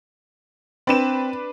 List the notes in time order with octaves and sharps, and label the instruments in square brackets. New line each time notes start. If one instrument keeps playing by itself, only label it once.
[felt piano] C4 [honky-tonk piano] D4 B4 E7